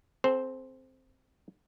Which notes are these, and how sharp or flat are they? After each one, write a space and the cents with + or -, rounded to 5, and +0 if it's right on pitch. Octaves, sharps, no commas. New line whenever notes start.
C4 +0 A4 -45 C5 +0